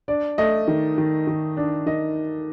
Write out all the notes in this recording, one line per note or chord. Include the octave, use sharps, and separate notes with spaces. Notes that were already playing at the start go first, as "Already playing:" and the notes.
D4 D5
A3 D#5
D#3
D#3
D#3
D4
D#3 D#5